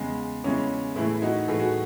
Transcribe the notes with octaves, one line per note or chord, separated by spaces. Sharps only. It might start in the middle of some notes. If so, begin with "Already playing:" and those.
Already playing: E2 C#3 G#3
E2 C#3 G#3 C#4 E4
A2 E3 A3 E4 G#4
E4
D#4 F#4
A2 E3 A3 G#4
F#4